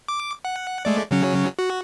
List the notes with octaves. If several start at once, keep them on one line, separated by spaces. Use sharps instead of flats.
D6
F#5
G#3 A3 D5
C#3 F#3 C#4
F#4